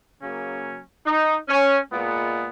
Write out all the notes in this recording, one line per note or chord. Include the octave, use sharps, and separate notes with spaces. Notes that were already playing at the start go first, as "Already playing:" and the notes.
C#3 F#3 A#3 C#4
D#4
C#4
A#2 G#3 B3